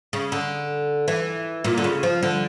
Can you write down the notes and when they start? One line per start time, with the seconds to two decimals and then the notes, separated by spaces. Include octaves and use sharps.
0.13 C#3
0.32 D3
1.08 E3
1.64 A#2
1.78 D3
1.84 C#3
2.03 F3
2.23 D3